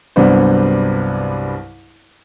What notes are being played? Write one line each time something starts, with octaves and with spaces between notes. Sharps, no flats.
C2 G2 F#3 B3 D4 C5